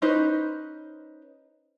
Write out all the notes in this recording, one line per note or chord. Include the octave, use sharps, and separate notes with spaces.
C#4 D#4 B4 C5